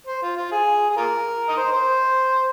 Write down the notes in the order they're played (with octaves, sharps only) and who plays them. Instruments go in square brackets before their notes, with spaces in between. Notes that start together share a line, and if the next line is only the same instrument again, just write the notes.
[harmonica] C5
F4
F4
G#4
G#4
F4 A#4
D#5
C5
C5